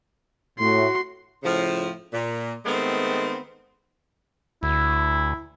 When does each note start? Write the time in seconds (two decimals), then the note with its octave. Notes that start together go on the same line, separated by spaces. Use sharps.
0.59 A2 F#4 C6
1.43 A2 C#3 F3
2.13 A#2
2.65 D#3 G#3 A3 B3 C4
4.63 D2 E4